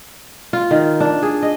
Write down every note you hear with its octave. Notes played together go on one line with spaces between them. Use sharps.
F4
D#3
D4
G#4
D#5